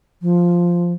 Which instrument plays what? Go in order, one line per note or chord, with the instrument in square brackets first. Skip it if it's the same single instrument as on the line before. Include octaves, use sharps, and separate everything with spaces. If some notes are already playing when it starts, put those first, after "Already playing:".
[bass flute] F3